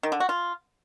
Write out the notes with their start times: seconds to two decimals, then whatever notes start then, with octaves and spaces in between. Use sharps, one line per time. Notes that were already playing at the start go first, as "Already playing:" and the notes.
0.03 D#3
0.12 D3
0.20 F#4
0.29 F4